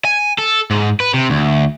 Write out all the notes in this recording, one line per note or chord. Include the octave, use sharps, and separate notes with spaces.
G#5
A4
G#2
B4
C3
D2